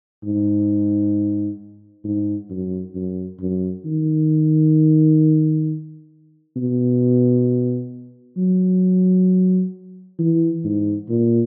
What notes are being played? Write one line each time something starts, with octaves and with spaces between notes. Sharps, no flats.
G#2
G#2
F#2
F#2
F#2
D#3
B2
F#3
E3
G#2
A#2